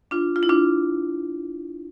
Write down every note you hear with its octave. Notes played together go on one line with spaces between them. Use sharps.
D4 F4
F4
E4
D4 F4